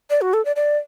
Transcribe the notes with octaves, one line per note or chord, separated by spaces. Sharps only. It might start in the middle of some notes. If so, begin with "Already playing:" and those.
D5
F#4
A4
D5
D5